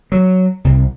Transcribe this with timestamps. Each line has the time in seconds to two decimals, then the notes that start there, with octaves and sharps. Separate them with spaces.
0.12 F#3
0.64 C2